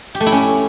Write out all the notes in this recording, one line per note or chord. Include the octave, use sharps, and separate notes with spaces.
G4
A3
E4
C#4